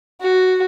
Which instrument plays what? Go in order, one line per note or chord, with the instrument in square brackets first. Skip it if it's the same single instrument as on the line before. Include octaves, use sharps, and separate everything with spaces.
[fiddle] F#4